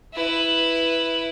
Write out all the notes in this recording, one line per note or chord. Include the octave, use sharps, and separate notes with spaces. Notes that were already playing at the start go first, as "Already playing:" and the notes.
E4 B4